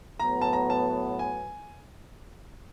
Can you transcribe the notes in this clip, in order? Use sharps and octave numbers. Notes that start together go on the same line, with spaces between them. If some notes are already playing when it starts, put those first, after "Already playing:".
A2 F#3 B3 A#5
A5
A#5
A5
G#5